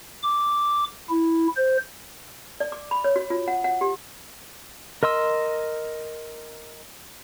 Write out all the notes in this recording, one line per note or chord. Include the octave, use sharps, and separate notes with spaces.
D6
E4
C5
D5
D6
B5
C#5
F#4
F4
F#5
F#5
G4
A#4 D#5 C6 E6